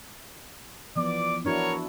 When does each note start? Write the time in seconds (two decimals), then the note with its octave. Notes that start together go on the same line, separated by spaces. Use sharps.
0.96 E3 F3 B3 D5 D6
1.45 D4 E4 F#4 A#4 C#5